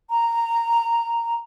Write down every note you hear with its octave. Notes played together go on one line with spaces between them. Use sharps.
A#5